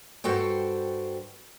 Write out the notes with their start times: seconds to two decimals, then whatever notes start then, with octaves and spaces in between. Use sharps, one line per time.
0.24 G2 F#4 A4 C5 G5